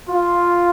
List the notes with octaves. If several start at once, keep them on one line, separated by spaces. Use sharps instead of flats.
F4